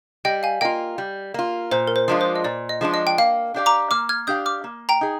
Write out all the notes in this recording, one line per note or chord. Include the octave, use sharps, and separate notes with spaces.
G3 D#5 G5
F5 G#5
A#3 F4 D#5 G5
G3
A#3 F4
A#2 C5
A#4
C5
F3 G#3 D4 F4
C5
D#5
A#2 D5
D#5
F3 G#3 D4 F4
D#5
G5
A#3 F5
D4 G4 D5 F5
A#5 D6
A#3 D6 F6
F6 G#6
D4 G4 D5 F5 D#6 G6
D6 F6
A#3
G5 A#5
D#4 G#4